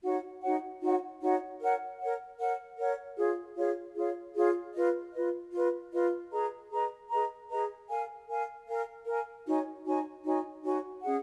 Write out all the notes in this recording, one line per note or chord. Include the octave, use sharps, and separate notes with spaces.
D#4 F#4 C#5 F#5
D#4 F#4 C#5 F#5
D#4 F#4 C#5 F#5
D#4 F#4 C#5 F#5
A#4 C#5 F#5
A#4 C#5 F#5
A#4 C#5 F#5
A#4 C#5 F#5
F4 G#4 C#5 F5
F4 G#4 C#5 F5
F4 G#4 C#5 F5
F4 G#4 C#5 F5
F4 B4 D#5
F4 B4 D#5
F4 B4 D#5
F4 B4 D#5
G#4 B4 D#5 A#5
G#4 B4 D#5 A#5
G#4 B4 D#5 A#5
G#4 B4 D#5 A#5
A#4 F5 G#5
A#4 F5 G#5
A#4 F5 G#5
A#4 F5 G#5
D#4 F#4 C#5 G#5
D#4 F#4 C#5 G#5
D#4 F#4 C#5 G#5
D#4 F#4 C#5 G#5
C#4 G#4 D#5 F#5